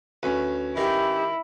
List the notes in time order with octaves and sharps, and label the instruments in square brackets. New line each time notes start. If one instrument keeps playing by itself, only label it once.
[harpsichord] D2 [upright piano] C#4 B4
[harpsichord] D#3 [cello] E4 [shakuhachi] G4